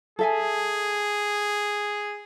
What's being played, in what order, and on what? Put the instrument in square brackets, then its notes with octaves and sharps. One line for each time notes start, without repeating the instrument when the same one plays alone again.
[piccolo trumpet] G#4 [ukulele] A4 E5 G#5